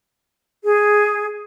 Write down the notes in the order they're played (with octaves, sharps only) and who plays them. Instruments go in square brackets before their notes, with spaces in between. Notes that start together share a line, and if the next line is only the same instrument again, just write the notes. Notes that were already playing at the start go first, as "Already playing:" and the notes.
[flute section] G#4